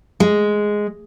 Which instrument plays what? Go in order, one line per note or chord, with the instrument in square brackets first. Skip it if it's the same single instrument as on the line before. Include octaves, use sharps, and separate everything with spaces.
[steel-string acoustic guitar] G#3